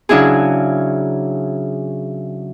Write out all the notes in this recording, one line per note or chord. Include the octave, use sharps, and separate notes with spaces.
C#3 F#3 D4 E4 G#4